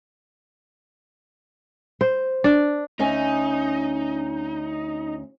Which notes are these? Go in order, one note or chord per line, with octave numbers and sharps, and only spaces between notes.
C5
D4
D2 C#4 D#4 G#5